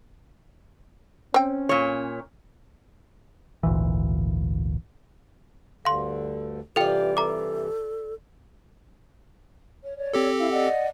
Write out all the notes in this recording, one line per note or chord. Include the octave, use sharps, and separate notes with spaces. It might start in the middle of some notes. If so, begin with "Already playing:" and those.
C4 C#4 G5
A#2 C#5
G#1 D2 A#2 E3
D2 G2 D3 A4 F5 C6
G2 C3 E3 F4 G4 A4 D5 G5
A4 A#5 D6
C#5
C#5 D5
C4 G4 A4
E4 F5
D5 D#5 F#5